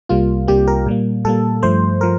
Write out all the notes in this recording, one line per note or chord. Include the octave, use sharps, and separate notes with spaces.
C2 C3 G3 A#3 F4
C2 C3 G3 A#3 G4
A#4
A#2 G3 A#3
A#2 G3 A#3 A4
G2 F3 A3 C5
F3 A#4